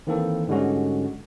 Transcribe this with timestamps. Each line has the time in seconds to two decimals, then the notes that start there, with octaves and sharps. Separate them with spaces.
0.07 D#3 E3 A#3 C4 A4
0.48 G#2 D3 G3 G#3 C#4 F#4